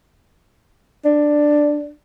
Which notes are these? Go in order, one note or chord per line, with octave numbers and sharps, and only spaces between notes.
D4